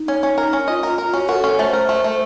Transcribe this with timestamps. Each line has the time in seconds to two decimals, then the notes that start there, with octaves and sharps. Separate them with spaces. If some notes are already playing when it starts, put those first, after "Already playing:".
Already playing: D#4
0.08 C#4
0.23 C#4
0.38 A#4
0.53 C#4
0.68 F4 D#5
0.83 F4 A#4
0.98 F4 A#4
1.13 C#4 F#4
1.29 F#4 A#4
1.32 A4
1.44 C#4
1.59 A3 C5
1.73 A#4
1.89 A3
2.04 A3